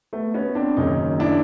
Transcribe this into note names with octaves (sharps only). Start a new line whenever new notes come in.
A3 B3
B3 C#4
C4 D4
F#1 F#2 D#3 C#4 D#4
D4 E4